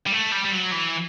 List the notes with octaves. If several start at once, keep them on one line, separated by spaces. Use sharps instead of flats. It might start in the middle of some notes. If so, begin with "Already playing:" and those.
G3
A3
G3
G3
F#3
E3